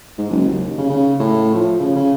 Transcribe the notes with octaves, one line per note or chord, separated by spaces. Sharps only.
G#2
F#1
D#2
C#3
C#3
A2
F3
C#3
C#3